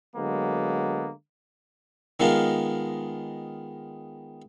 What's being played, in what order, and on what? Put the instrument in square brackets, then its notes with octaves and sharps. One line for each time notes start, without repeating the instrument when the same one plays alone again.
[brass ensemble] D3 F#3 G#3 A#3 B3
[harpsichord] D#3 G#3 B3 F4 A#4